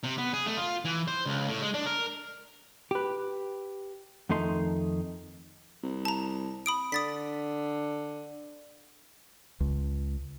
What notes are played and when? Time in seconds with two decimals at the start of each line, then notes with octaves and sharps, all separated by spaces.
0.03 C3
0.18 B3
0.34 G#4
0.46 A3
0.57 F4
0.85 E3
1.08 C5
1.26 C#2
1.48 A2
1.62 G#3
1.74 D4
1.86 A#4
2.91 G4 B4
4.29 F2 D#3 A3 D#4 C6
5.83 C2
6.05 A5 A#5
6.66 B5 D#6 D7
6.92 D3 D#6 A6 B6
9.60 C#2